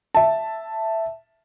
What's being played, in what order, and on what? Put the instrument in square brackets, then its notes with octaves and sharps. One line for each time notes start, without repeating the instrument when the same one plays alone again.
[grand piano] E5 A5